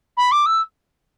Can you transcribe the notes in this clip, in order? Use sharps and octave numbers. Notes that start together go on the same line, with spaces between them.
B5
D6
E6